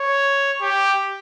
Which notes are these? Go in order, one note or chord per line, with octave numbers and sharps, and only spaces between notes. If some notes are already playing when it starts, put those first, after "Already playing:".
Already playing: C#5
G4